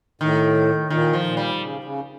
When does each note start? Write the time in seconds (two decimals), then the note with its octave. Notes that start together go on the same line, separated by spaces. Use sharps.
0.21 A2 D#3
0.90 A#2 D#3
1.13 F3
1.26 A#2
1.37 G3
1.61 C#3
1.84 C#3